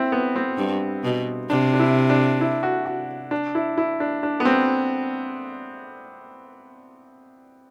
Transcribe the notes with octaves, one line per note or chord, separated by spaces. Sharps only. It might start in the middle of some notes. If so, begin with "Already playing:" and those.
Already playing: C4 E4
B3
C4
G2
B2
C3 D4
D4
E4
D4
E4
F#4
F#4
D4
E4
E4
D4
D4
B3
C4